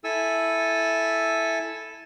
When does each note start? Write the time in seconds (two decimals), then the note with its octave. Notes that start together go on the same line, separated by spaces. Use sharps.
0.04 E4 A4 G#5 E6